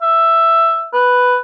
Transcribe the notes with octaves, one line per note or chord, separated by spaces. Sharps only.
E5
B4